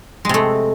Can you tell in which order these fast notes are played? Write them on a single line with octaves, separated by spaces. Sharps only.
G#3 C3 A3